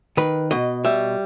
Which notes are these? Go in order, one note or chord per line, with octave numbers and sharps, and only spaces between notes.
D#3 B4
B2 D#5
G3 E5